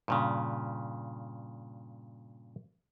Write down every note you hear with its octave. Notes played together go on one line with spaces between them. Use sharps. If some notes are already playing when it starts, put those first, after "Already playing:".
G2 A#2 C#3